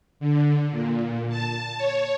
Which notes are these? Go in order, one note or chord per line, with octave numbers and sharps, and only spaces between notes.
D3
A#2
A5
C#5